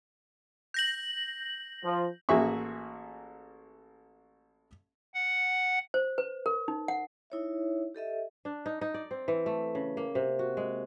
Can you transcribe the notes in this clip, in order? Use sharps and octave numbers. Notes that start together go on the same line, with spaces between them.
G6 A#6 F#7
F3
A1 A#3 F#4 G#4 E5 C#6
F#5
C5
B4
A#4
D#4
F#5
D#4 E4 C#5 E5
G4 A4 D#5 E5
D4
D#4
D#4
D5
C4
E3
A3
C#3
A#3
C3
F#4
G#3